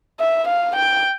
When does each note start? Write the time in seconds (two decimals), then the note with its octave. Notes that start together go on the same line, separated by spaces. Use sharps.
0.20 E5
0.48 F5
0.76 G5